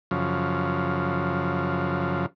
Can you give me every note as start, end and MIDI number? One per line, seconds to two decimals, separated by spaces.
0.11 2.26 42
0.11 2.26 49
0.11 2.26 53